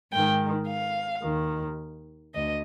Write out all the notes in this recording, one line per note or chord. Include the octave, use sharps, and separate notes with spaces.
G#2 D#3 G5
F5
D#2 D#3
D2 D#5